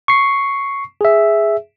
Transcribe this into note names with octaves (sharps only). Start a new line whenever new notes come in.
C#6 C7
G#4 E5